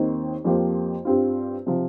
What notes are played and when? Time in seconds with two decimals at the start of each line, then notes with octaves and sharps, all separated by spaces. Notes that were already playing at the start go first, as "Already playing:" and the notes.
Already playing: D#2 D#3 C4 D#4 C5
0.45 F2 F3 A#3 G4 C5
1.05 G2 G3 C4 F4
1.66 C3 F3